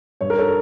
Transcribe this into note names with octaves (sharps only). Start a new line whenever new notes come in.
G2 C#5
A#4
A4 C#5